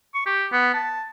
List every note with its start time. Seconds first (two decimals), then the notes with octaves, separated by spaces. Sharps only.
0.14 C#6
0.26 G4
0.52 B3
0.74 A5